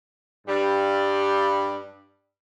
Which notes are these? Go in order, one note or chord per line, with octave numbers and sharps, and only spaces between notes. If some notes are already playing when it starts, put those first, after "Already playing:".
G2 G3